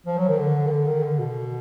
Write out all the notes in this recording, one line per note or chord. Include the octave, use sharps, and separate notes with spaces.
F3
F#3
D#3
D3
D#3
D3
D#3
D3
B2